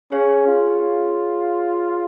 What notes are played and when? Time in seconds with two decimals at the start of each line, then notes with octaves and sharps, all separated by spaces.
0.12 C#4 G#4 C#5 F5
0.47 F4